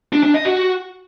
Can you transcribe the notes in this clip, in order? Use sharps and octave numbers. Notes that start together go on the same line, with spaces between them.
D4
D4
D#5
F#4